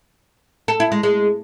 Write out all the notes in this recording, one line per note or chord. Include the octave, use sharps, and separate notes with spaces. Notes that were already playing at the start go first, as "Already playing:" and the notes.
A4
E4
G#3
G#3